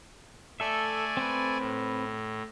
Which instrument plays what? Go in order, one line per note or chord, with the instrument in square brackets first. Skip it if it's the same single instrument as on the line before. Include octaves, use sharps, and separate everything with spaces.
[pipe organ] A3 D5 G#5 [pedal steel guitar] A4 E5
[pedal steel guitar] C4 B4
[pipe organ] A2